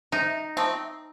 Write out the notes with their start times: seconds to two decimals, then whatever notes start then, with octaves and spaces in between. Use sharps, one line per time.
0.12 C3 D#4
0.57 F3 A3 C4